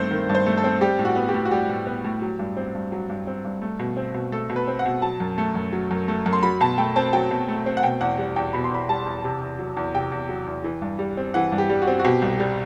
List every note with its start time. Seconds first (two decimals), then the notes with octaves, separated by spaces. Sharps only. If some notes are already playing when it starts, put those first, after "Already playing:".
Already playing: G2 D#3 A3 C4 C5
0.11 D#3
0.29 G2
0.35 C5
0.46 A3
0.57 A4
0.64 C4
0.81 G3 G4
0.99 A2
1.05 F#4
1.16 B3
1.29 G4
1.34 A2
1.45 F#4
1.51 G3 G4
1.69 A2
1.87 B3
2.04 A2
2.22 F#3
2.39 G2
2.57 C4
2.75 G2
2.92 F#3
3.09 G2
3.27 C4
3.45 G2
3.62 A3
3.79 B2
3.97 C4
4.14 B2
4.32 A3 A4
4.50 B2
4.56 B4
4.68 C4
4.79 F#5
4.86 B2
5.02 F#3 A5
5.20 F#2
5.38 A3
5.55 F#2
5.73 F#3
5.91 F#2
6.08 A3
6.26 F#2
6.33 C6
6.43 F#3 B5
6.61 B2 A5
6.78 A3 G5
6.96 C4 A5
7.13 F#3 G5
7.31 B2
7.49 A3
7.66 C4
7.77 F#5
7.83 B2 G5
8.01 E2 F#5
8.18 G3
8.36 E2 G5
8.53 B2 B5
8.64 C6
8.71 E2 B5
8.89 G3 A5
9.06 E2
9.24 C3
9.42 E2
9.59 F#3
9.77 E2
9.94 C3 G5
10.12 E2
10.29 F#3
10.47 E2
10.64 E3
10.82 G2
10.99 G3
11.17 C4
11.34 E3 F#5
11.52 G2
11.58 G4
11.69 G3
11.82 F#4
11.87 C4
11.99 F#4
12.04 B2 G4
12.22 C2
12.40 G3